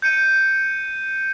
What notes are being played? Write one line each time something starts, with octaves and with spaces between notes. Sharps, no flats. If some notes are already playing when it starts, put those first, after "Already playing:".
G6 C#7 D#7